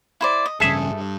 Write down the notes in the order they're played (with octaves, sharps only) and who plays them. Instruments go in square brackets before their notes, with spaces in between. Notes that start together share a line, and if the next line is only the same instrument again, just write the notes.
[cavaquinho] E4 C5 D5
D#5
[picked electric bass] A1 G2 C#3 [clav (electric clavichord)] G#4 E5 [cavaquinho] A4 D#6
[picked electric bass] G2